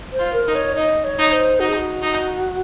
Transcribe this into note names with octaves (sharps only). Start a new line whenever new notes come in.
C5
F4
A#4
D#4
C#5
D#4 D#5
C#5
D#4
C5
D#4 F#4
G#4
F#4
D#4